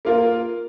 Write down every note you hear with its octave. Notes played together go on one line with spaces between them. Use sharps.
A#3 F4 A#4